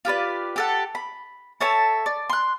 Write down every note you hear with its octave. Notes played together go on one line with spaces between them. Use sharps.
F4 G4 B4 D5
G4 A4 F#5
B5
A4 C#5 E5 A5
D5
C6 F#6